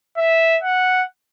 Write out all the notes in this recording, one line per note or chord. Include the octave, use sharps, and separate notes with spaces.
E5
F#5